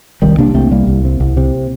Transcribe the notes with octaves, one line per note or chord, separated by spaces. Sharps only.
C2 D#3 G3
C3 A#3 D4
C2 A3 C4
C3 G3 A#3
C2
C3
C2
C3